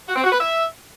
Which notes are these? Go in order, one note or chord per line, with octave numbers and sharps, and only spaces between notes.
F#4
C4
F#4
B4
E5